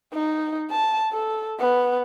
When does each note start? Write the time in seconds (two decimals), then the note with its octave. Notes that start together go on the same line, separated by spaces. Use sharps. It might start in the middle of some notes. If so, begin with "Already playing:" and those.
0.13 D#4
0.71 A5
1.12 A4
1.60 B3